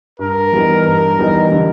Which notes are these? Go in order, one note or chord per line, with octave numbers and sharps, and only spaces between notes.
G2 A#4
E3 G3 B3 D#4
G2 A#4
E3 G3 B3 D#4
D3